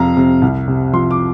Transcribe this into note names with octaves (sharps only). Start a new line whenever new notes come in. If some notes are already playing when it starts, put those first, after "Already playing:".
Already playing: F2 C3 F3 F5 A#5
C3
C2
C3
F3 C6
D6